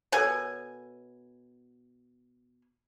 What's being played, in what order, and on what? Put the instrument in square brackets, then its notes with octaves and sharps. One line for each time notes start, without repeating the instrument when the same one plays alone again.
[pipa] B2 G#5 [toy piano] A4 A#4 C#5